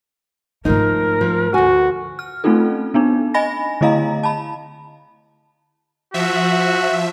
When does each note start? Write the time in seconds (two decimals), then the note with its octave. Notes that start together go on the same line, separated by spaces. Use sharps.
0.65 G#2 F3 A3 D#4 A#4
1.21 F3
1.54 D2 F#4 G#5
2.19 F6
2.44 A3 C4 C#4 D#4 F4 A4
2.94 B3 D4 D#4
3.34 D#5 G#5 B5 A#6
3.81 D3 A3 E4 D#5 F5 A#5
4.23 A5 B5
6.14 F3 F#4 E5